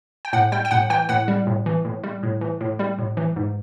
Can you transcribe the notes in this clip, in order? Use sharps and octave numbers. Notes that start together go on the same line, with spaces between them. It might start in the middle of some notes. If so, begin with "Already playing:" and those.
G5
A2 F#5
G3 G5
G5
A2 F#5
E3 G5
A2 F#5
G3
A2
E3
A2
G3
A2
E3
A2
G3
A2
E3
G#2